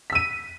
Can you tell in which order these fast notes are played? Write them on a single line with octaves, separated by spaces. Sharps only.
B6 E6 D#7